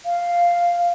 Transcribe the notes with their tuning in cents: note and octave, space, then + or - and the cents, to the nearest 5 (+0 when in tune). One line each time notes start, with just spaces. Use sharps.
F5 -5